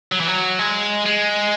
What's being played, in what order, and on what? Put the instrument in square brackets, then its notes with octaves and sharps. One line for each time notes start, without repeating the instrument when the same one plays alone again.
[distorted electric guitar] F#3
E3
F#3
G#3
G#3